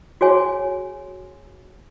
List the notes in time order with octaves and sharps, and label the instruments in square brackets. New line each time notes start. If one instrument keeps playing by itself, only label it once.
[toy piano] F#4 G#4 C#5 G#5